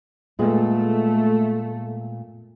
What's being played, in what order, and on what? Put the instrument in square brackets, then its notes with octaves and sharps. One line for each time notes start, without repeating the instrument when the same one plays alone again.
[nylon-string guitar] A#2 G#3 B3 [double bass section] A3